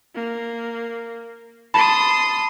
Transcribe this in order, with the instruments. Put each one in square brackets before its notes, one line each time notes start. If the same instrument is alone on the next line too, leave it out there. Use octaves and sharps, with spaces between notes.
[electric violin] A#3
[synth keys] A5 [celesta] B5 [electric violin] C6 D#6